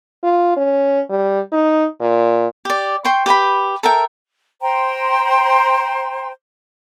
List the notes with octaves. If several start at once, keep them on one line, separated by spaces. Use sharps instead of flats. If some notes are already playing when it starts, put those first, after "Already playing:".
F4
C#4
G3
D#4
A#2
G4 D5
C5 G5 C6 C#6
G4 B4 G5 B5
A4 A#4 E5 G5
C5 G5 A#5 C6